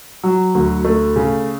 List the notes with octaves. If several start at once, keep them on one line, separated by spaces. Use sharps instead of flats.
F#3
D2
A3
C#3